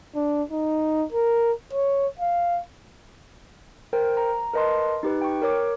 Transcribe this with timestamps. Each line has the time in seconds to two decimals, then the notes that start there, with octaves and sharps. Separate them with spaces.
0.16 D4
0.51 D#4
1.12 A#4
1.73 C#5
2.20 F5
3.93 A#4 C5 G5
4.17 A#5
4.54 A#4 B4 D#5 A5 C6
5.03 D#4 G4 B4
5.21 G5 C#6
5.42 A#4 C#5 D6